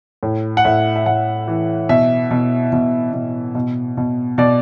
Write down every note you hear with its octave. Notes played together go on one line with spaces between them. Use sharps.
A2
F#5
A2 E5
E5
A2 F#5
E3
B2 E5
B2
B2
B2
B2
B2
B2 D5